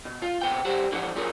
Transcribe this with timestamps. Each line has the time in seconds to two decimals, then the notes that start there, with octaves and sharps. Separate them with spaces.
0.05 B2
0.22 F4
0.42 C3 B3 G5
0.65 G3 G4 C5 F#5
0.91 C2 D3 E3 F3 F#5
1.15 F#3 G3 F4 G#4 A#4 C#5